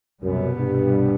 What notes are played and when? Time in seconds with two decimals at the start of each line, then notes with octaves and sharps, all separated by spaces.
0.22 C2 F#2 B2 G3 B3
0.58 G2